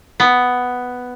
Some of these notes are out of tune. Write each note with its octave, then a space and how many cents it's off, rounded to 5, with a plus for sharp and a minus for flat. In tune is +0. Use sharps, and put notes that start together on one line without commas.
B3 +5